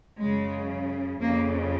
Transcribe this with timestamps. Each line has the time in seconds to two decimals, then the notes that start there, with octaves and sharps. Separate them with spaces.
0.21 F#2 C#3 G#3
1.20 F2 C#3 A#3